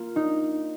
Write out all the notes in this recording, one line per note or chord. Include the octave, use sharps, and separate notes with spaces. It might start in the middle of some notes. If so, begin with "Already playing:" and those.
Already playing: A#3 F4
D#4